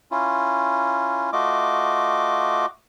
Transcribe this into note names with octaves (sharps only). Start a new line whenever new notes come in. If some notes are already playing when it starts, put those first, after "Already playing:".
C#4 E4 F4
A3 F4 F#4 D#5 D6